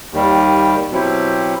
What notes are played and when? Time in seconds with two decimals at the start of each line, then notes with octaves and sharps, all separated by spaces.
0.12 D#2 D#3 G3
0.91 B2 F#3 C4 E4 G4